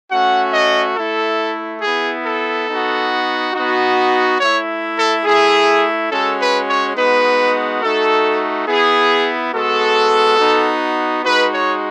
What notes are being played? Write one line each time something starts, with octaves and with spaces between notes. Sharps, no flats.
A3 C#4 F#4 F#5
D#5
A3 E4 A4
B3 E4 G#4
A4
B3 D#4 F#4
B3 D#4 F#4
A3 E4 C#5
A4
A3 E4 G#4
G#3 C#4 F#4 A4
B4
C#5
G#3 B3 D#4 F#4 B4
A3 D#4 F#4 A4
B3 E4 G#4
G#3 B3 F#4 A4
B3 D#4 F#4
G#3 D#4 F#4 B4
C#5